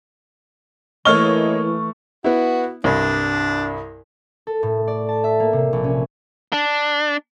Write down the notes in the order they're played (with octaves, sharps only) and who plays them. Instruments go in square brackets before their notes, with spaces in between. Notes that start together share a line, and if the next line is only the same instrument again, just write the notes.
[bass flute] E3 [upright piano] A3 F6 G7 [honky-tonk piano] A#3 C#5 D#5 [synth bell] C#6
[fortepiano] B3 E4 [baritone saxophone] F#4
[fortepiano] C2 G2 [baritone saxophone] D4
[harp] A4
A2
D5
A5
E5
A#3
C3
A#1
C#4
[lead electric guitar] D4